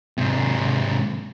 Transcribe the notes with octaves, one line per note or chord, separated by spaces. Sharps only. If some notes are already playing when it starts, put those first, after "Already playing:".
G#2 C3